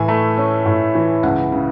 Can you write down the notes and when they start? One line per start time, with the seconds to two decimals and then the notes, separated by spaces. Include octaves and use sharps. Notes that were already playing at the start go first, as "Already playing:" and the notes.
Already playing: A2 E3 G#5
0.08 A3
0.37 C#4
0.66 A2
0.95 E3
1.23 C#2 F#5
1.52 C#3